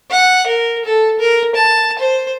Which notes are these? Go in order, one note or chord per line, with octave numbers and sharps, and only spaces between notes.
F#5
A#4
A4
A#4
A5
C5